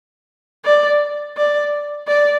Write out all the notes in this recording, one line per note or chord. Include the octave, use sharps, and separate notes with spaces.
D5
D5
D5